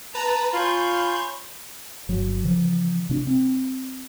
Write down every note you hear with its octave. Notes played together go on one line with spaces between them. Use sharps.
B4 A5 A#5
F4 C#5 G#5 B5 C6 G6
G1 F#3
C#3 E3 F3
C3 C#4 D4
C4